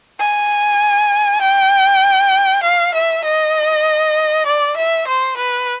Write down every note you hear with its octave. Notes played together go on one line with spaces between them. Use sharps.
G#5
G5
F5
E5
D#5
D5
E5
C5
B4